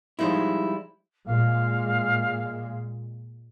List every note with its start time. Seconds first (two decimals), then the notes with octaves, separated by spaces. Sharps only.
0.19 F3 G3 G#3 D#4 E4
1.26 A#2 G#3 F5